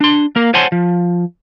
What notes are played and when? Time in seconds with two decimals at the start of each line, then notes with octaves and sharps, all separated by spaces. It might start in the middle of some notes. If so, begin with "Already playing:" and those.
0.01 D4 C6
0.36 A#3 A#4
0.54 C5 C#5 F#5 G#5 A5 C6
0.72 F3